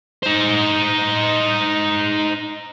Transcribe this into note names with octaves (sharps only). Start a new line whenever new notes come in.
D#4 C5